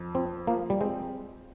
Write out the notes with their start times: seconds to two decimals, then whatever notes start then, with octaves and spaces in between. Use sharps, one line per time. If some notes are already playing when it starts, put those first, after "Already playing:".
Already playing: F2
0.14 F3 C4
0.47 F3 A#3
0.70 G3
0.81 G#3 C4